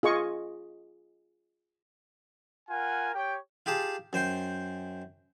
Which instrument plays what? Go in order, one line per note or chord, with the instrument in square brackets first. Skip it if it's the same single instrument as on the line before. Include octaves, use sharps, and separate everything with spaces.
[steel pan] F4 G#4 D#5 C#6
[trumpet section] F4 A#4 F#5 G#5
G4 C#5 G5
[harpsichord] F4 G4 G#4 A5
F#2 C5 G5 C6